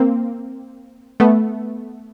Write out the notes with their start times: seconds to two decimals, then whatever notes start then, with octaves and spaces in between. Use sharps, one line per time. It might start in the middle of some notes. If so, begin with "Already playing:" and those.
Already playing: A#3 C4
1.20 A3 B3